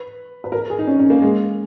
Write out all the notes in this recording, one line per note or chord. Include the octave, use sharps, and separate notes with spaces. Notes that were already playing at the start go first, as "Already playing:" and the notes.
Already playing: B4
B4
A#4
G#4
D#4
C#4
C#4
A#3
G#3